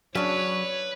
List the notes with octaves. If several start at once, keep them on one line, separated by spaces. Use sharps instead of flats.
C#3 F#3 D4 B4 C#5